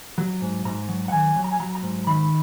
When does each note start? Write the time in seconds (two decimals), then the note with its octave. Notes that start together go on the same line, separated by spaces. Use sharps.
0.18 F#3
0.42 G#2
0.65 G#2 A#5
0.89 F#3
1.08 F#5
1.12 D#3 G#5
1.36 F#3
1.44 A#5
1.51 G#5
1.60 F#3 A#5
1.75 A#5
1.82 G#2
2.07 D#3 B5